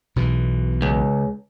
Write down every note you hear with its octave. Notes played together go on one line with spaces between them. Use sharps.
B1 B2 E3
C#2